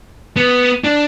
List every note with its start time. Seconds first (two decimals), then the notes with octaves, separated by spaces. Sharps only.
0.37 B3
0.84 D4